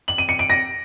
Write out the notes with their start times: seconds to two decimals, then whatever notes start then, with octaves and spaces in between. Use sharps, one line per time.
0.08 F#7
0.18 D#7
0.29 C#7
0.39 D7
0.50 A#6